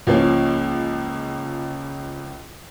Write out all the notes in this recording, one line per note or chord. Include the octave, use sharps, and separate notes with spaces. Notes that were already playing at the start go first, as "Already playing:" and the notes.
C#2 F3 A#3 C#4